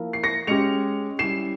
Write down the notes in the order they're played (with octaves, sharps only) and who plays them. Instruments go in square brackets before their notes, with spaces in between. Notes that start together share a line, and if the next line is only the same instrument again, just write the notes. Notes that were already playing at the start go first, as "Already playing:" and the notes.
Already playing: [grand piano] F3 A#3 E4 A#4
[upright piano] C7
A#6 C#7
[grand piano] G#3 C#4 G4 [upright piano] C#7 F7
[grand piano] G3 C#4 E4 [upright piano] C7 E7